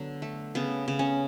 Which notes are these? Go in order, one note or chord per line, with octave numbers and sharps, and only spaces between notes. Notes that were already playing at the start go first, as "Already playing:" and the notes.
Already playing: D3 F#3 B3
A3
C#3 B3
C#3
C#4